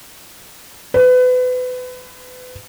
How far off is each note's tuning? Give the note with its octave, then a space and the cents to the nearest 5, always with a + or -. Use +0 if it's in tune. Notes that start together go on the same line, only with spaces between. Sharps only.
B4 +30